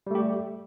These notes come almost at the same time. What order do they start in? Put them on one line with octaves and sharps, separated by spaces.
G3 A3 G4